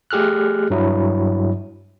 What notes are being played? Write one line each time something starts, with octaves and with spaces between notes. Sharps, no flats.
A3 G4 G#4 F6 F#6
G2 F#3 E4